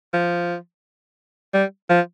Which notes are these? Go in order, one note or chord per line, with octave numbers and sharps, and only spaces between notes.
F3
G3
F3